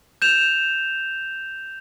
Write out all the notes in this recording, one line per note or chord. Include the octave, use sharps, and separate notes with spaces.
G6 E7 F7